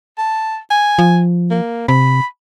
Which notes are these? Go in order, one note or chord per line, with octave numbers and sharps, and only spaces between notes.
A5
G#5
F3
A#3
C3 B5